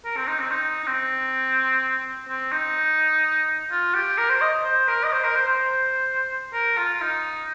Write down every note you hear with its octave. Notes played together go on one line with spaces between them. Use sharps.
A#4
C4
D#4
C4
D#4
D#4
C4
C4
D#4
F4
G4
A#4
C5
D#5
C5
A#4
D#5
C5
A#4
C5
C5
A#4
F4
F4
D#4